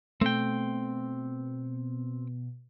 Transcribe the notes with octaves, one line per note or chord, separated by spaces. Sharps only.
B2 A3 C4 G5